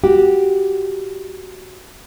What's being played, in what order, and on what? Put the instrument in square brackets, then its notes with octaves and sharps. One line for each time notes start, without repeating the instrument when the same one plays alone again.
[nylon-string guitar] F#4 G4